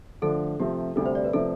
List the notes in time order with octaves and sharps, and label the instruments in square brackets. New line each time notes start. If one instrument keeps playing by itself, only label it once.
[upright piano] D3 F3 A3 D4 [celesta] A4
[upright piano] C3 F3 A3 C4 [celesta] G4
[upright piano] D2 C3 G3 [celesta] A4
[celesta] C5
D5
B4
[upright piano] C3 F3 A3 [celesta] A4